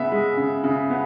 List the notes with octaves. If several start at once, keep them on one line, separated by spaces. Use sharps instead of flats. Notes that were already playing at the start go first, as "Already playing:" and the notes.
Already playing: C#3 B3 E5
G#3
C#3
C#3
B3